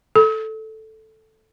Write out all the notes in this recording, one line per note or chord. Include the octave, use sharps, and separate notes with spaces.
A4